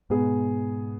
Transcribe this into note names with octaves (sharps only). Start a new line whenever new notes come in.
G#2 B2 B3 G#4